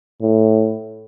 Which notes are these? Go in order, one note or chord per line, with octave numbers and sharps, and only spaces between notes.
A2